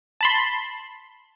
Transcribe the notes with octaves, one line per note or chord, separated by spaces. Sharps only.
A5 B5 C6